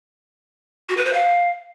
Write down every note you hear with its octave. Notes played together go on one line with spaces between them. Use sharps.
F#4
B4
C5
F5